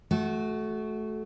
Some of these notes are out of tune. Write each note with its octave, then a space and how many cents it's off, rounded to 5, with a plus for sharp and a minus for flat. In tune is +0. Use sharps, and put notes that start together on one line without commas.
A3 -25 F#4 +0